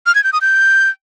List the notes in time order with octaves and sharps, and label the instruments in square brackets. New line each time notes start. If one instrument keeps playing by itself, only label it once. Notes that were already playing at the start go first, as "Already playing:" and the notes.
[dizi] F6
G#6
G6
D#6
G6